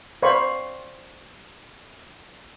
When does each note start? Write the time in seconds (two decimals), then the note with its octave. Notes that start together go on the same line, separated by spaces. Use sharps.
0.23 C5 D5 F5 B5 C#6